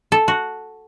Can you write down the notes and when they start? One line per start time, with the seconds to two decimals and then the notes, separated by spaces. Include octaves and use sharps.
0.12 A4
0.28 F#4